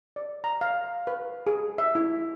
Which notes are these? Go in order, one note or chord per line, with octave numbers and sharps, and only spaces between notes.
D5
A#5
F5
B4
G#4
E5
E4